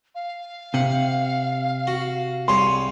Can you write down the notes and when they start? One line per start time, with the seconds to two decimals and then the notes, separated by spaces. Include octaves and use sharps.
0.15 F5
0.74 C3 F#5
1.87 F#4
2.48 C2 G#4 C#5 C6